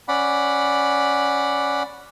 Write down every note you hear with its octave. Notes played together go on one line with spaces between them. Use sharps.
C#4 D5 F#5 B5